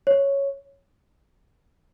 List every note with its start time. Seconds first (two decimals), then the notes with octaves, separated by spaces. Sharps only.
0.07 C#5